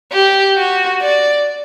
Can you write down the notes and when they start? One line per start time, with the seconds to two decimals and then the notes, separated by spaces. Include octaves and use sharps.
0.13 G4
0.57 F#4
1.02 D5